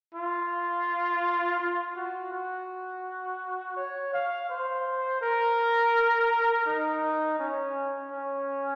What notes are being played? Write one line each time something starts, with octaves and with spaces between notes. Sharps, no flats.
F4
F4
F#4
F#4
C#5
F5
C5
A#4
D#4
C#4
C#4